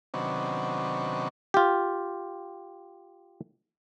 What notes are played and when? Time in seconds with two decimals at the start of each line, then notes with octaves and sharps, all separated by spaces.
0.14 C3 D#3 F#3 B3 C#4 D4
1.54 F4 G4